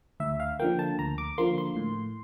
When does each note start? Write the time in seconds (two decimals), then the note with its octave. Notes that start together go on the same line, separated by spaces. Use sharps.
0.20 D2 E5
0.40 F5
0.59 D3 F3 A#3 G5
0.79 A5
0.99 D2 A#5
1.18 D6
1.38 D3 F3 A#3 C6
1.58 C6
1.76 A2